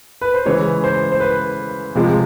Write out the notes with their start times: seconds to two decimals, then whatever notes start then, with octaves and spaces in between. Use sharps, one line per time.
0.21 B4
0.34 C5
0.46 C#3 E3 G#3 C#5
0.84 C5
1.12 C5
1.20 B4
1.95 C3 F3 G#3